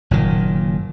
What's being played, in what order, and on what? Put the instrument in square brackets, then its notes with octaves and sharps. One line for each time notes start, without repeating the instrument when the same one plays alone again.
[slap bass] F#1 A#2 D#3